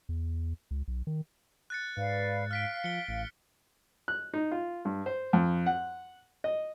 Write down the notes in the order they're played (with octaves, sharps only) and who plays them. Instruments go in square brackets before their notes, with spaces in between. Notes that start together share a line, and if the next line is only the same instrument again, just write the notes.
[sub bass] E2
C#2
B1
D#3
[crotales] F#6 A6 C#7
[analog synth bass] G#2 [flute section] B4 D5 F5
[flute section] F5 [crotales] F6 B6 D7
[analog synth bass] F3 [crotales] C#7 G7
[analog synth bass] A1
[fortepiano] F#6
D#4
F4
G2
C5
F2
F#5
D#5